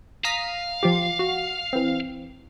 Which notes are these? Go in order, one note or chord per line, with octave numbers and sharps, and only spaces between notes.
F5 A#5 D#6 B6
F3 F4 G4
F#4
E3 C4